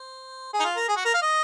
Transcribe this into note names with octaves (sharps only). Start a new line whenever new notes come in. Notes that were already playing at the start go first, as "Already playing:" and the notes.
Already playing: C5
G#4
D#4
F4
A#4
G#4
F#4
A#4
F5
D#5